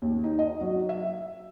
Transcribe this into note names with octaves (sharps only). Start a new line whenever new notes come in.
D#2
D#4
D#5
F#3
E5